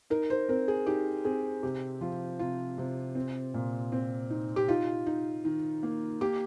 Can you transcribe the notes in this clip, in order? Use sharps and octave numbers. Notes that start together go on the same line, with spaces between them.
D#4 A#4
C5
C4 A#4
G#4
D#4 G4
C4 G#4
C3 G4
F3 F4
C3 F4
C3
C4
A#2
C4
D#4
G4
D#4 F4
D#4
D#3
A#3
A#3 G4